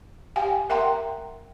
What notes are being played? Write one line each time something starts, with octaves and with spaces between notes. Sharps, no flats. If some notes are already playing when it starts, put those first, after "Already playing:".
G4 F5 G5 G#5
A#4 E5 F#5 G5 A#5 C6